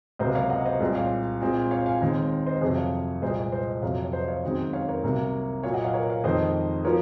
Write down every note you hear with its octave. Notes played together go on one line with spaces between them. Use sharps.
C#2 C3 F#3 A#3 C5 D#5
C#5 F5
D#5 F#5
C5 D#5
C2 A#2 G#3 C4
C#5 F5
A#2 G#3 C4
C#5 F5
F5 G#5
D#2 D#3 G#3 C4
C5 D#5
F2 C3 F#3 G#4 C5
C#5 F5
C2 A#2 G#3 C5 D#5
C5 D#5
F2 C3 F#3 C#5 F5
C#5
C5 D#5
C#5 F5
F#2 D#3 G#3 C4
C#5 F5
A#4 C#5
C2 C3 F#3 A#3
A#2 F#3 A#3 C#5 F5
D#5 F#5
C#5 F5
A#4 C#5
C#5 F5
F2 D#3 G#3 C4 C5 D#5
F3 A#4 C#5